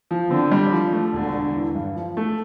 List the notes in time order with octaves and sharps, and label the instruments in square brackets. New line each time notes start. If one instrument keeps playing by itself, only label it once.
[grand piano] F3
[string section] D3 [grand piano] C4
[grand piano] G3
F3
A3
[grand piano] E1 [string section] D3
[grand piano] E1
E3
G2
F3
A3